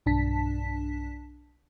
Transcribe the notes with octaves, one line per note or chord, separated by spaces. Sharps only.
B1 G2 D4 A5 B6